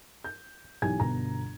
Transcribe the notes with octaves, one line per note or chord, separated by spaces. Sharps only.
G6
B1 E3 G4 G#5 G#6
G1 B2 A#5